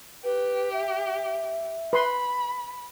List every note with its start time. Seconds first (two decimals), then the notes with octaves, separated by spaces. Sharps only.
0.24 G4 B4
0.73 E5
1.93 B4 B5 C6